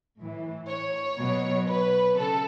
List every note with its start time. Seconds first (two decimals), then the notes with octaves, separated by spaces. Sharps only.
0.18 A2 E3
0.68 C#5
1.18 B2 F#3
1.67 B4
2.17 C#3 A4